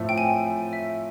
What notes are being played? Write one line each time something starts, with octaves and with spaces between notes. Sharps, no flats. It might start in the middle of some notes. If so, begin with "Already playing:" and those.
Already playing: A2 F3 A3 C4
G5
G#5
E5